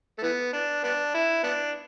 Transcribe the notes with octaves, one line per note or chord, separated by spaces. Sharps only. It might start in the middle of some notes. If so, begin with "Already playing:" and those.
A3
E3 B3
D4
B3 D4
E4
B3 D4